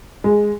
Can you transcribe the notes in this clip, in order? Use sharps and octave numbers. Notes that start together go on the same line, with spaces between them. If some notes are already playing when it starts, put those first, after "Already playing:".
G#3